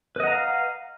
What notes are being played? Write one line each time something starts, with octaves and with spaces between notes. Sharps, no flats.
B4 D#5 F5 F#5 A#5